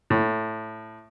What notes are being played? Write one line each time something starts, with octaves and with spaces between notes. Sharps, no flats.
A2